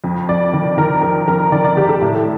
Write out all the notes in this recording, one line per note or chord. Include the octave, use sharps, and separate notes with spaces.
F2
F2 D5
D#3 D5
D#3 A#4
F2 A#4
F2 A#4
D#3 D5
D5
D#3 G4
A4
A2